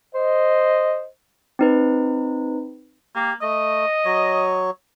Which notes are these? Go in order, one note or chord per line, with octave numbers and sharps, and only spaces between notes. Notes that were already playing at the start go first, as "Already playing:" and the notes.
C5 D#5
C4 D#4 B4
A#3 G4
A3 D#5
F#3 C#5